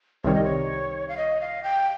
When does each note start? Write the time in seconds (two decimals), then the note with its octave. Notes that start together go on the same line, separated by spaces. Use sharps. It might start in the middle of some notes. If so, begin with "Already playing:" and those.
0.24 C2 C3 D#3 G3 C4 C#5
0.34 D#5
0.44 C#5
1.08 F5
1.17 D#5
1.41 F5
1.63 G5